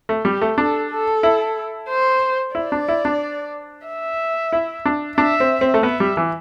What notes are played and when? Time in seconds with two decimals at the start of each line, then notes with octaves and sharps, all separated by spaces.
0.09 A3
0.25 G3 G4
0.41 A3
0.58 D4 A4
0.91 A4
1.23 E4
1.89 C5
2.55 E4 D5
2.72 D4
2.88 E4
3.05 D4
3.86 E5
4.52 E4
4.85 D4
5.18 D4 E5
5.40 C4
5.61 C4
5.74 A3
5.83 B3 E5
6.00 G3
6.17 E3